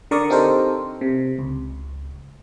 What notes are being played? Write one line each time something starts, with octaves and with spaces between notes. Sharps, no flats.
D3 A#4 D5 C#6 D#6
C4 D#4 G4 A4 A#4 C5
C3
C#2